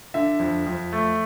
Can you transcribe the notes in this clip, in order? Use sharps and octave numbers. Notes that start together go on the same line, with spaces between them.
D3 E5
F2
F2
A3